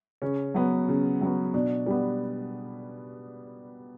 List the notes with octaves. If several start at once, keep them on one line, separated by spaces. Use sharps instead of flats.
C#3 C#4
F#3 B3
C#3
F#3 B3
B2 D4
G3 B3